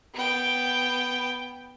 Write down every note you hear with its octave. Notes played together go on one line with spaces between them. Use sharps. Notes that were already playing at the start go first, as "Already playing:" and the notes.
B3 G5